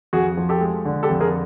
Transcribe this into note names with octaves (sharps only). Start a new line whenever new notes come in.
F2 F#4 G#4
F3
G4 A4
G#3
D3
G4 A4
F2
G#4 A#4